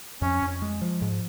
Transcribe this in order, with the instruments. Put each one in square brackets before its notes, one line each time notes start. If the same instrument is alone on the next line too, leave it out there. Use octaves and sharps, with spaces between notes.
[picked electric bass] F2 [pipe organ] C#4
[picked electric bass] F2
G#3
F3
G#2